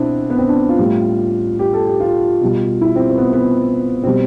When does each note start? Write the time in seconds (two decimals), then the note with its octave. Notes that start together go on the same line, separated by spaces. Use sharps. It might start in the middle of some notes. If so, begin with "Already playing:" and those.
Already playing: B2 B3 C4 D4 E4
0.30 B3
0.38 C4
0.48 D4
0.69 F4
0.79 A2 G3
1.59 G4
1.74 A4
1.87 G4
2.00 F4
2.41 B2 G3
2.81 E4
2.96 C4
3.10 C4
3.18 B3
3.33 B3
4.04 B2 G3 C4